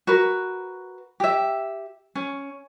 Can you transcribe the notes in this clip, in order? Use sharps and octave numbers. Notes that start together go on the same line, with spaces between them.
F#4 A#4 B4
G4 E5
C#4